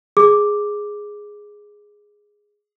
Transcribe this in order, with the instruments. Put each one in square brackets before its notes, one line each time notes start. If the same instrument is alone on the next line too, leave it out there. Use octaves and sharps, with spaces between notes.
[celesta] G#4 D6